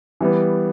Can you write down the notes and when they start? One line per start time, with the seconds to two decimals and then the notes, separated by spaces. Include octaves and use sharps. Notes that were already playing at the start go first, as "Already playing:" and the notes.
0.21 E3 G3 B3